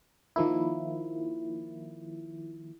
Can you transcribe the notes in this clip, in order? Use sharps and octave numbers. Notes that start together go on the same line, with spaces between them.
D#3 F3 A#3 E4